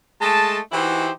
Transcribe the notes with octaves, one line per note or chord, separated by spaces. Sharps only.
G#3 A3 D#5 A5
E3 D#4 E4 F#4 G4 C5